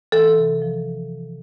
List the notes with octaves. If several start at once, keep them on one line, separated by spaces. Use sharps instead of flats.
E3 A4
C3
F3